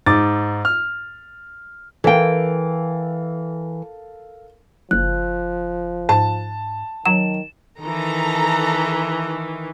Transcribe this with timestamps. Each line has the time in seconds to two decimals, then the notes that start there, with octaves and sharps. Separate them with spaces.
0.06 G#2 D6 A6
0.65 F6
2.04 E3 A4 A#4 F5 G5
4.91 F#1 F3 F#6
6.09 G#2 A5
7.06 D#3 F#3 E7
7.81 D#3 E3 A4 A#5